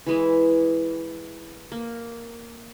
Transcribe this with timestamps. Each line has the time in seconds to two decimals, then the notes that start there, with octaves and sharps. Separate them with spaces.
0.06 E3 G#3 E4
1.72 A#3